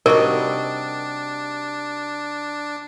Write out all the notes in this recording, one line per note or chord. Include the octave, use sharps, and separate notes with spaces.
C3 G3 D4 D#4 F#4 A#4